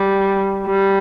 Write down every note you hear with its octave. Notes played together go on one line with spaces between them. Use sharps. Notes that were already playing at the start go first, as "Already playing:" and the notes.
Already playing: G3
G3